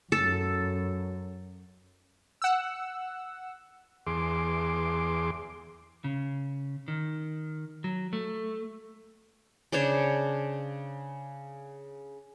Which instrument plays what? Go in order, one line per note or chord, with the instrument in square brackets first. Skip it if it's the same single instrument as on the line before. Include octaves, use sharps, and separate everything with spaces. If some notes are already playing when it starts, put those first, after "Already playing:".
[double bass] F#2 [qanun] A4
[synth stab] F#5 E6
[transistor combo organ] E2 G#4 C6 D6
[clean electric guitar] C#3
D#3
F#3
A3
[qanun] C#3 D4 C5 C#5